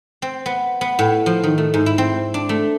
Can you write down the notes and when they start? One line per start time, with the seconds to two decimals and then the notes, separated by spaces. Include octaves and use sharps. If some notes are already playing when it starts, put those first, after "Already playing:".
0.22 C4
0.46 B3
0.81 B3
0.99 A2
1.26 F3
1.44 D#3
1.58 A3
1.74 G#2
1.86 E4
1.98 C4
2.34 D4
2.49 A3